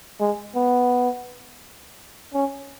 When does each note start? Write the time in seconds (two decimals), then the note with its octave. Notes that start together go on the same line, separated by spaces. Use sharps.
0.20 G#3
0.56 B3
2.34 C#4